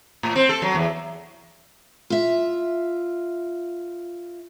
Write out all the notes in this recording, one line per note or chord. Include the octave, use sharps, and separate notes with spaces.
A2
C4
A4
F#3
E2
F4 E5